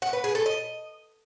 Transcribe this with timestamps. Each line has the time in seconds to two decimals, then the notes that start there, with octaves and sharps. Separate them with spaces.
0.02 F#5
0.13 B4
0.24 G#4
0.35 A4
0.46 D#5